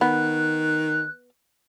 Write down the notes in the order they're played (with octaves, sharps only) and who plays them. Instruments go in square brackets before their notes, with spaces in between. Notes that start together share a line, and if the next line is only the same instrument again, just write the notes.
[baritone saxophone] D#3 [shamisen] B3 [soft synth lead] F#6